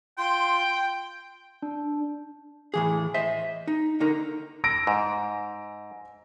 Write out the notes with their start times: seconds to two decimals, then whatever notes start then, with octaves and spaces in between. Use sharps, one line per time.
0.18 F4 G5 C6
1.62 D4
2.74 A2 E3 G#4
3.14 C5 D#5 E5
3.67 D#4
4.00 D3 D#4 A#4
4.64 E6 A#6 D7
4.87 G#2